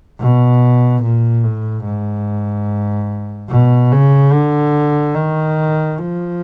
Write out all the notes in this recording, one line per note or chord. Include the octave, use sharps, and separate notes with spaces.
B2
A#2
A2
G#2
B2
C#3
D3
D#3
F3